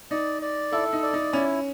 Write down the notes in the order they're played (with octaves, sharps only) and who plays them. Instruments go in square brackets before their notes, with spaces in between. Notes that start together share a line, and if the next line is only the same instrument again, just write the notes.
[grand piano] D#4 [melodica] D5
[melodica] D5
[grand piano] E4 [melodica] A4
[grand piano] D#4
[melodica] D5
[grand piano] D#4
[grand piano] C#4 [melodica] E4